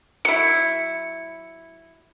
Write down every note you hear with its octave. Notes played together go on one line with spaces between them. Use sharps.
F#3 E4 C#7